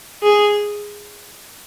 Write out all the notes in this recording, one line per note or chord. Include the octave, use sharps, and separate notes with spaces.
G#4